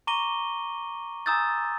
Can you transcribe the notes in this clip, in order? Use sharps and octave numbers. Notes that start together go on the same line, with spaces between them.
A#5 C#6 D6 A#6 D#7 G7
G#5 A#5 D#6 E6 G6 A6